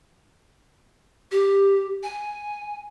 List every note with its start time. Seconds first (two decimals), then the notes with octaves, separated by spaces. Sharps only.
1.31 G4
2.03 G#5